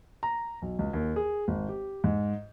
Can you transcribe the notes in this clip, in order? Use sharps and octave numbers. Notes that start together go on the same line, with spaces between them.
A#5
B1
C#2
D#2
G#4
G#1
G4
G#2